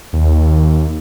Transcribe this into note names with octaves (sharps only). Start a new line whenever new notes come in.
D#2